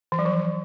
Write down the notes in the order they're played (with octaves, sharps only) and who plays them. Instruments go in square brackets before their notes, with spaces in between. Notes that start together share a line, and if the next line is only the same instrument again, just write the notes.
[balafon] E3
F#3
F3